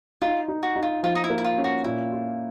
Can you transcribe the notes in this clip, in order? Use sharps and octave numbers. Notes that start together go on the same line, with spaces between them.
D#4 F4
D#4
F#4
D#4
F4
F3 F4
D#4
E4
A#3
E4
F4
C#4
F#4
A#2 E4
F4